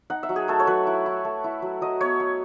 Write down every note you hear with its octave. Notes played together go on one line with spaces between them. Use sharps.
D#4 F#5
E5
F#3
G#4
A3 A4
C#5
F#3 B4
E4
E4
A3
E4
F#3
F#3 D#5
B3 C#5
B3